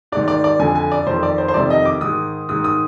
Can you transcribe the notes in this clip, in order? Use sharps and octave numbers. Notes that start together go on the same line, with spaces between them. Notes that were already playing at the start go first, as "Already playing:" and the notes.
G#2 D#3 D5
D5
D5
F2 D3 G#5
G#5
D5
F2 D#3 C5
D5
C5
C5
F2 C3 D#3 D5
D#5
D6
G#2 D#3 D#6
G#2 D#3 D#6
D#6